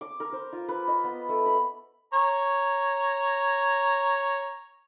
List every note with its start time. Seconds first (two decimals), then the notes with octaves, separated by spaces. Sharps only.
0.01 D6
0.20 A#4
0.32 C5
0.53 F4
0.68 B4
0.88 D#5
1.04 B3
1.29 A3
1.46 B5
2.13 C#5 A#5